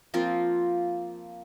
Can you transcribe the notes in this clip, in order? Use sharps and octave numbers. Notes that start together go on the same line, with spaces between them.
F3 A#3 C4 F4